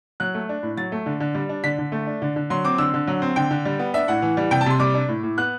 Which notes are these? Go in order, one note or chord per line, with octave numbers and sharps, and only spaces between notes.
F#3 F#6
A3
D4
A2
F#3 A6
A3
D3
D3
G3
D4
D3 B6
D3
A3
D4
D3
D3
F#3 C6
C4 D6
D3 E6
D3
F#3
C4
D3 G5
D3
G3
B3
D4 E5
A2 F#5
E3
G3
C3 G5
A5
C3 C6
G3 D6
D4
A2
A2
B3 F#6